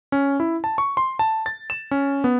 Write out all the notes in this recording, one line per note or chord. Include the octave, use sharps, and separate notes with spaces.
C#4
E4
A5
C#6
C6
A5
A6
E7
C#4
B3